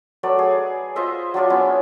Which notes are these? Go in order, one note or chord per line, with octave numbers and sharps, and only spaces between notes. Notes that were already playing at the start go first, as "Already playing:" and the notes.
F#3 A3 B4 D5
G#4
F4 C5 D#5 E5
F#3 D4 F4 D5
B3 C#4 E4